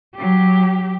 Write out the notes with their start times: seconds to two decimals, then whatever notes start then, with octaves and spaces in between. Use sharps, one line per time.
0.17 F#3 G4